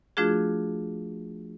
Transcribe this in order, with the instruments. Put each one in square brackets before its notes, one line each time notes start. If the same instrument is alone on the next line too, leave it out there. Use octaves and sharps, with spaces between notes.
[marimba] F3 A3 D4 F4 F#4 G#4